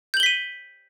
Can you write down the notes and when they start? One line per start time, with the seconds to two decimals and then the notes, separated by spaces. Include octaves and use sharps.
0.14 G6
0.17 F#7
0.20 G7
0.23 B6
0.26 D#7